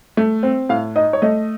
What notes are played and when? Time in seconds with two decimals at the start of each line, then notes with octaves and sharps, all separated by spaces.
0.17 A3
0.43 C4
0.69 A2 F5
0.96 D#4 D#5
1.13 C#5
1.22 A3 D#5